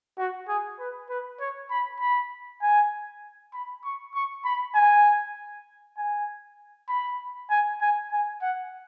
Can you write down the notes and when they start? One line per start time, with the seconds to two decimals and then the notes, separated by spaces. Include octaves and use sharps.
0.18 F#4
0.48 G#4
0.79 B4
1.09 B4
1.40 C#5
1.71 B5
2.00 B5
2.62 G#5
3.54 B5
3.84 C#6
4.15 C#6
4.45 B5
4.75 G#5
5.97 G#5
6.89 B5
7.50 G#5
7.81 G#5
8.12 G#5
8.42 F#5